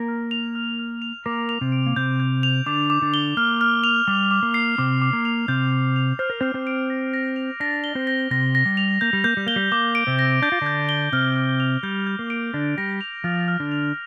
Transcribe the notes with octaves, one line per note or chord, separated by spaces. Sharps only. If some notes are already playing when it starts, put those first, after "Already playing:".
Already playing: A#3 A#4
F6
F7
F6
F6
F7
A#3 A#4 D6
F7
C3 C4
D7
A#3
C3 C4 G6
G6
F7
D3 D4 D6
D6
D3 D4
G7
A#3 F6
F6
F7
G3 D6
D6
A#3
C7
C3 C4 D6
D6
A#3
F7
C3 C4 G6
G6
F7
C5 F6
A#4
C4 C5 F6
C4 C5
D7
A#6
A#6
F7
D4 D5 A#6
G7
C4 C5
A#6
C3 C4 A#6
A#6
G3
F7
A#3 G6
G3
A#3 G6
G3
A#3 G7
G3
A#3 D6
D7
C3 C4
A#6
D4 G6
F4
D3 D4 G6
G7
C3 C4 F6
F6
F7
G3 G6
G6
A#3
D7
D3 D4 A#6
G3 G4 A#6
F7
F3 F4 F6
F6
D3 D4
F7